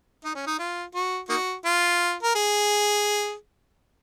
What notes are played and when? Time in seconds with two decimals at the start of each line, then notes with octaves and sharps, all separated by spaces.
0.25 D#4
0.35 C#4
0.47 D#4
0.59 F4
0.95 F#4
1.29 A#3 D#4 F#4
1.65 F4
2.23 A#4
2.35 G#4